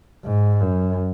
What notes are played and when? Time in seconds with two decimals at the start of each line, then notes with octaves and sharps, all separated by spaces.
0.25 G#2
0.61 F#2